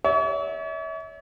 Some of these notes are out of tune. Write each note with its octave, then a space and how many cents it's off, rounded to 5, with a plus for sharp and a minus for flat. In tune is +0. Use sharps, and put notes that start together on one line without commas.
C#5 +40 E5 -35